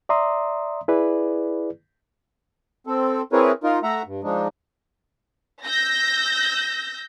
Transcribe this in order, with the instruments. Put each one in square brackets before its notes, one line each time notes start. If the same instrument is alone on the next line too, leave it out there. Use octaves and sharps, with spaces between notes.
[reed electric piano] D5 E5 A#5 C6 D#6
E4 G#4 B4 D5
[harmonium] C4 A4
C4 E4 G#4 A#4 B4 C#5
D#4 F4 A#4
A3 E5 F#5 A#5
G2
F3 G#3 D4 D#4
[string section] E6 G6 A#6